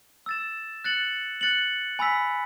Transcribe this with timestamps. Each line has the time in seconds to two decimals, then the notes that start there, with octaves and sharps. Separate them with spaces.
0.26 E6 A6 E7
0.84 F#6 A6 C#7 F#7
1.41 F#6 A6 C#7 F#7
1.99 G#5 B5 E6 B6